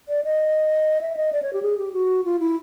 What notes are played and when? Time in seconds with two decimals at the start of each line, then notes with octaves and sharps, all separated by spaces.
0.09 D5
0.24 D#5
1.01 E5
1.17 D#5
1.33 D5
1.42 C#5
1.53 G4
1.62 G#4
1.78 G4
1.93 F#4
2.24 F4
2.40 E4